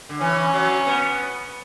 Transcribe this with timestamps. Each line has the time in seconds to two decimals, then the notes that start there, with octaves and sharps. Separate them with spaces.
0.09 D3
0.21 E3 C#4
0.53 F#3
0.86 B3